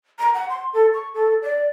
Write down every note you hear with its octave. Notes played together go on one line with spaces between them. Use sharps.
A#5
F#5
C6
A4
C#6
A4
D5